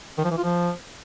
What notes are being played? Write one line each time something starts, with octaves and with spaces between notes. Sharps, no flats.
D#3
F3
E3
F4
F3